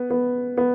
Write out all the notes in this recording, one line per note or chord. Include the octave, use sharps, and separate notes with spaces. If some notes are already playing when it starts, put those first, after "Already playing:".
Already playing: B3
B3
B3